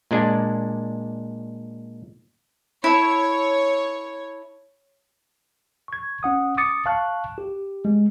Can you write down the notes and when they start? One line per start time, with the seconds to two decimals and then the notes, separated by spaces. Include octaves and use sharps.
0.11 A#2 G#3 D4
2.84 E4 A4 C#5
5.88 C#6 G#6
6.23 C#4 F#5 D#6
6.57 D6 D#6 A6 C#7
6.86 F5 A5 C#6 F#6
7.38 G4
7.85 G#3